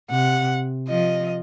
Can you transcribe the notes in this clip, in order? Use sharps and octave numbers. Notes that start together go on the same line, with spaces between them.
C3 F#5
F3 D#5